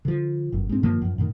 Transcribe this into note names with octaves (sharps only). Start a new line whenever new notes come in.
D3 F3
G1 F#2
G#2 C4
G2 D#3 F3 A#3
F#2 F3
F#2 A2 D#3